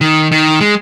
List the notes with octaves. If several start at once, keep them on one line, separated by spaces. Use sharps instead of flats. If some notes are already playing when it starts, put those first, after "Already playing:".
D#3
D#3
G#3